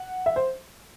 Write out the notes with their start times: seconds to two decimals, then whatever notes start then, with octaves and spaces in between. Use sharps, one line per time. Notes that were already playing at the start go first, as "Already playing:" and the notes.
Already playing: F#5
0.26 E5
0.36 C5